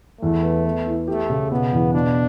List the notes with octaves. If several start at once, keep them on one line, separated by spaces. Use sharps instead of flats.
E2 A3
B3
B3
E3
A3 G4
C#3
B2 B3
E2
B2 D4